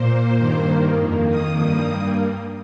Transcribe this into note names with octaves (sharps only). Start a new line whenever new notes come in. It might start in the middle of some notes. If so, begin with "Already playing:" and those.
Already playing: A#2 A#3 C5
G2 D#3 A#3 C5
F2 D#3 A#3
D#6
G2 G3 A#3